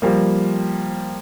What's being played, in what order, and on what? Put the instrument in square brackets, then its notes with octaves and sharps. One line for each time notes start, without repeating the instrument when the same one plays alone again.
[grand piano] F3 G3 A#3